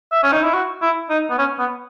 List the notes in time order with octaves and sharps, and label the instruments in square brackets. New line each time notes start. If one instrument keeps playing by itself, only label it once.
[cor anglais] E5
C#4
D#4
E4
F#4
E4
D#4
B3
C#4
B3